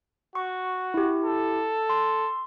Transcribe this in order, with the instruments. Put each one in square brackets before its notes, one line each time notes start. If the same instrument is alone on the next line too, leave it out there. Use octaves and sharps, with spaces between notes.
[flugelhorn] F#4 [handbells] C#6
[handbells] E4 G4
[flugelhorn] A4
[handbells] C6